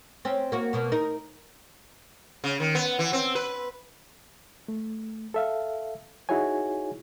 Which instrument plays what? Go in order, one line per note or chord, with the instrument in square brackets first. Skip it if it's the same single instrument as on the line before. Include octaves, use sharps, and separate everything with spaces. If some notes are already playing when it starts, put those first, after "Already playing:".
[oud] C4 C#4
A#3 F#4
B2 A#3 B3
D#4 A#4
[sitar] C#3
D#3
B3
E3
C4
B4
[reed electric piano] A3
A4 E5 F5
D#4 E4 F#4 G#4 C#5 G#5